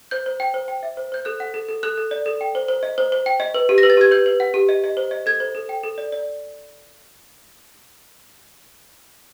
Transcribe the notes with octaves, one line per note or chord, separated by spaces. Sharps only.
C5 G6
C5
G5
C5
G5
E5
C5
C5 G6
A4 F#6
F#5
A4
A4
A4 F#6
A4
D5
A4
G5
C5
C5
D#5
C5
C5
G5
D#5
B4
G4
A#6
B4
A6
G4 G#6
B4 G6
B4
F#5
G4
D#5
D#5
C5
D#5
A4 G#6
C5
A4
G5
A4
D5
D5